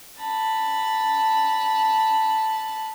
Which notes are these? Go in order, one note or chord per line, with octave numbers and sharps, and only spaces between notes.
A5 B5